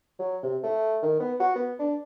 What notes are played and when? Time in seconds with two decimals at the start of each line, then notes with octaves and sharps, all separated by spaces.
0.19 F#3
0.43 C3
0.63 A3
1.02 D#3
1.20 B3
1.40 F#4
1.55 B3
1.79 D4